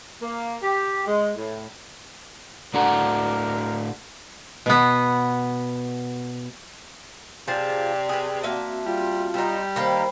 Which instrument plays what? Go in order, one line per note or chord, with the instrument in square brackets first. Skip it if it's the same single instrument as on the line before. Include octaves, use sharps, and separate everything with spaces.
[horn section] A#3
G4
G#3
A2
[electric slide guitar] A2 F#4 A#5 [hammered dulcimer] D3 A5 [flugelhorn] A#4
[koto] B2 B3
[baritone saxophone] C3 [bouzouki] F3 G#4 A5 [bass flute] D5
[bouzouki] G#4 B4
[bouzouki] A#3 E5 [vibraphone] C4 F#4 A5
[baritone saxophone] G3 [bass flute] F4
[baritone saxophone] G3 [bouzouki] C4 D#4
[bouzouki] D#3 A#3 [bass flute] A#4 [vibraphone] C5 G5 B5